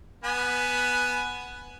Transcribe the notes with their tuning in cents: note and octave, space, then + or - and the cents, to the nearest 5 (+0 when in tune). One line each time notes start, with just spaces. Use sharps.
B3 +0 G#5 +10 B5 +5